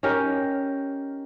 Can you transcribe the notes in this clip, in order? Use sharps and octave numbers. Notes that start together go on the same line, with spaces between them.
C#4 D#4 G4 A#4